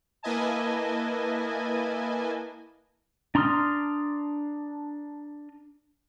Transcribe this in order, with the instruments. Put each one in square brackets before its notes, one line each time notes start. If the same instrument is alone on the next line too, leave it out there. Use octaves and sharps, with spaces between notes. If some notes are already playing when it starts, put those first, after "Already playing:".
[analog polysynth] A#3 E4 B4 D#5 G#5 A5
[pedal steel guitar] D4 A#5 C6 D#6 F6